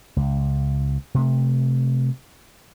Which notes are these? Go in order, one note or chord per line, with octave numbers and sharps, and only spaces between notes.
C#2
C3 A3